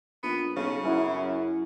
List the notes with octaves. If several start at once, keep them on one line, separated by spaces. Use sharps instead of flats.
A#1 B3
B1 C#3 F5
F#2 C#4 E4 F#4